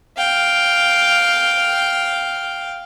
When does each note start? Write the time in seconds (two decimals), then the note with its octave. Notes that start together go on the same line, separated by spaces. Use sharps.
0.17 F5 G5